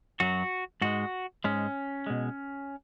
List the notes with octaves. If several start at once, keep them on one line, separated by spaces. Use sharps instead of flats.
F#2 F#3 F#4
G#2 G#3 F#4
G#2 G#3 C#4
B2 G#3